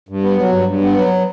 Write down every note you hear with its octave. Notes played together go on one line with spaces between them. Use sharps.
G2
B3
F#3
G2
G2
B3
F#3